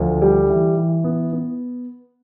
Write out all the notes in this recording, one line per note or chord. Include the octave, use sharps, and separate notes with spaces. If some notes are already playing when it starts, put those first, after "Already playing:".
Already playing: D2 F3
G3
E3
E3
B3
B3